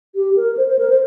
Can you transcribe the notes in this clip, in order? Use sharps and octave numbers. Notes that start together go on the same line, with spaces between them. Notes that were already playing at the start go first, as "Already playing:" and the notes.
G4
A#4
C5
C5
A#4
C5